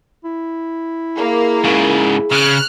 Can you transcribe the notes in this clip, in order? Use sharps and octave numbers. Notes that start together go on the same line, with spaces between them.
E4
A#3 G#4
G#2 C#3
C#3 F6 F#6